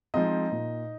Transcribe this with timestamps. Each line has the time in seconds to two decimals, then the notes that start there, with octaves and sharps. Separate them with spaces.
0.14 F3 G#3 C4 D#4 D#5
0.52 A#2